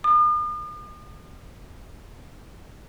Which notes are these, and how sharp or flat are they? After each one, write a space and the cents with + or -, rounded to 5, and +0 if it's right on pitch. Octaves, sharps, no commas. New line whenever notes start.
D#6 -45